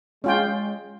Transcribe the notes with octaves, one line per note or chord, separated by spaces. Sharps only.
G#3 C#4 F4 G5